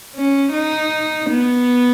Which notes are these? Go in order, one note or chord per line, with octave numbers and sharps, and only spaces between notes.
C#4
D#4
B3